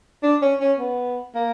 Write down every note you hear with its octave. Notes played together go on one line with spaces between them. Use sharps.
D4
C#4
C#4
B3
A#3